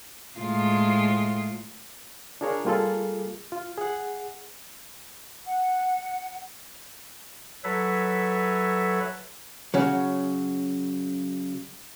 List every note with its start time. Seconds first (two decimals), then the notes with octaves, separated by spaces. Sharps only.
0.40 A2 G#3 F4
2.41 D4 F4 G#4 A#4 C#5
2.65 G3 A#3 F4 G#4 A4
3.52 F4
3.78 G#4 F#5
5.45 F#5
7.64 F#3 A4 B4 C#5 E5
9.74 C#3 F#3